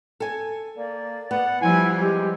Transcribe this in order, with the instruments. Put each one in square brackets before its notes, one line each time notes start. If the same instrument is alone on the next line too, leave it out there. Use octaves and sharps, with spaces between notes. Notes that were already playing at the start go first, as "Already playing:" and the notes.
[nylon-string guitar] A4 G#5
[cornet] A#3 [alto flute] D5
[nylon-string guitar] B3 [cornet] F#5
[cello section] F3 G3 [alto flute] E4 [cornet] G#5
[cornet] G#3 [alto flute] G4